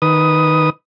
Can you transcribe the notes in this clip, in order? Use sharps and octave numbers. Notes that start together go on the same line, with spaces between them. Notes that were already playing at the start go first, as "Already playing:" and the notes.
D#3 B4 D#6